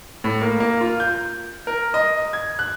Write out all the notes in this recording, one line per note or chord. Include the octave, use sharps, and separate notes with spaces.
A2
A#3
A#3
F4
G6
A#4
D#5
G#6
F#6